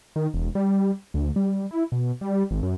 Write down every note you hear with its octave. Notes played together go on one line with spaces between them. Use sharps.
D#3
E1
G3
D2
G3
E4
B2
G3
G#1
F#2